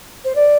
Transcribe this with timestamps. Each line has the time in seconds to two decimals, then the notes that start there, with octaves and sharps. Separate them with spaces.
0.24 C5
0.35 D5